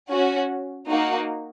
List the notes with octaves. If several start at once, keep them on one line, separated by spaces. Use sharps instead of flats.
C#4 F#4
A#3 D#4 F#4